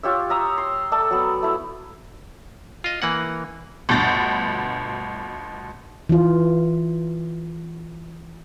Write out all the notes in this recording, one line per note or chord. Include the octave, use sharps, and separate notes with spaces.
F4 G4 C#5 E5
E5 A#5 D#6
C6
A3 A4 D5 E6
F#3 B3
A3 E4
F4 D#5
E3 A#3 F#5
G1 D2 B2 G6 A6
E3 F4